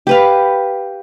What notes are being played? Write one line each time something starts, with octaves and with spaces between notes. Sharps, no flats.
G4 B4 F5